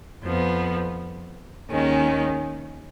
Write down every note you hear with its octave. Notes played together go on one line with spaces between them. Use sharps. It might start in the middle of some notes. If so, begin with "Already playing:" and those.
F2 F3 B3
D#2 D#3 G#3 C#4